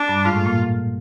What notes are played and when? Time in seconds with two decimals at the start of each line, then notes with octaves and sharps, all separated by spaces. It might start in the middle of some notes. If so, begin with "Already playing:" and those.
Already playing: D4
0.09 G2 G3
0.25 G#2 G#3 F4
0.36 A2 A3
0.46 A#2 A#3